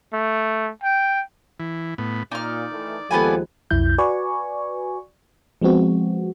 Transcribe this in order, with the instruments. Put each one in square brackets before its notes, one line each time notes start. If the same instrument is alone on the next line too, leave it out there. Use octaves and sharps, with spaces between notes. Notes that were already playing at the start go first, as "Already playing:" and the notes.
[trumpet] A3
G5
[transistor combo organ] E3
A2 B3
[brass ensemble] A#2 [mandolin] D#4 F6 [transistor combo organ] D5
[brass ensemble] D#3 E3 A3
[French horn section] D#2 F3 G#3 [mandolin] B3 B4 G#5 [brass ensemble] G4 A4
[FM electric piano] B1 F2 E4 G6
F#4 B4 D5 G#5 C#6
F3 G#3 B3 C4 F#4